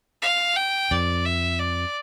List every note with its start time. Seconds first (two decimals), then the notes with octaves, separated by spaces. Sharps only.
0.22 F5
0.56 G5
0.91 F2 D5
1.25 E5
1.60 D5